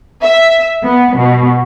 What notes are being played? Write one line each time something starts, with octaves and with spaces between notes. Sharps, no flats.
E5
B3
B2